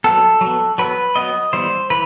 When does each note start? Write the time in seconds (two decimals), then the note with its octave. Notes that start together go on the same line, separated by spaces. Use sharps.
0.04 F#3 B3 A4
0.41 F#3
0.46 B3
0.78 F#3 B3 B4
1.16 F#3 B3 D#5
1.53 E3 G3 B3 C5
1.90 E3 B4